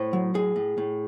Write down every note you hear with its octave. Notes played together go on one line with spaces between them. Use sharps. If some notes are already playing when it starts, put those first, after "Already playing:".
Already playing: A2 C5
F#3
A2 G#4
A2
A2